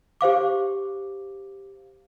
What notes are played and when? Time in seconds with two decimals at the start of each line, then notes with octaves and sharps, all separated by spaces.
0.21 G4 C5 F5 D6